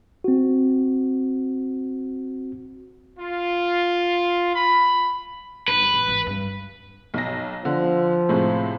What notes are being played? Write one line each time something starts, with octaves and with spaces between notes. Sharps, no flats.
C4 F#4
F4
B5
G1 D#4 B4
A2 E3
G#1 E3
G2
B1 A#6
D3 F3
A2 C3 G#3